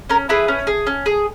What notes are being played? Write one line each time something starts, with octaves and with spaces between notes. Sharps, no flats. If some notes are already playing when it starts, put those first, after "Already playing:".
C#4 A#4
E4 G#4 B4
C#4
G#4
C#4
G#4